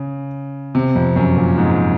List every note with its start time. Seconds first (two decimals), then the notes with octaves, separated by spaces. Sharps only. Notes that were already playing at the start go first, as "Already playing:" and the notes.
Already playing: C#3
0.75 C3
0.95 F2
1.16 F#2
1.37 A#2
1.58 G#2